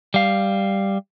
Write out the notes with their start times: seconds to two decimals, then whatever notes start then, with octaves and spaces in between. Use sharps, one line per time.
0.14 G3 F5